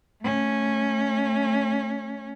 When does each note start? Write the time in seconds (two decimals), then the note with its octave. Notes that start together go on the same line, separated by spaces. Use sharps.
0.22 A3 C#4